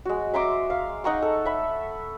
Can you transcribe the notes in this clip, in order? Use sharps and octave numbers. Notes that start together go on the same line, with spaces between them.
G#3 F#4
E5 A#5 C6 D6
F5
D#4 F#5 A#5 C#6
A4
E5 B5